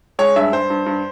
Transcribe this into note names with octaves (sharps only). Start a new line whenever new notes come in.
G#3 C#5
G2 E5
G2 C5
G2
G2